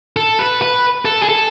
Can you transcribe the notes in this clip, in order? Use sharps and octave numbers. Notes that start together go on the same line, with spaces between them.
A4
B4
B4
A4
G#4
A4